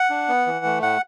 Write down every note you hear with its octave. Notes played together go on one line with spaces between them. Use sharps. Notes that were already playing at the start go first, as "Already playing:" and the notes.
Already playing: F#5
D4
B3
E3
A3
A2 F#5